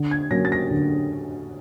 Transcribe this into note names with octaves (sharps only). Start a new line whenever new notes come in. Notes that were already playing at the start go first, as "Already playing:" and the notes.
Already playing: D3
G#6
F#3 A#3 C#4 A#6
A6
A#6
D3